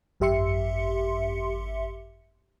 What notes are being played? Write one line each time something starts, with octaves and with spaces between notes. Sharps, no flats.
G#1 F#2 G4 E5 C6 C#7